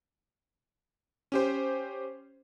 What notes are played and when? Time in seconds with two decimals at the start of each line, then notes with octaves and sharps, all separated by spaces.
1.32 C#4 G4 C5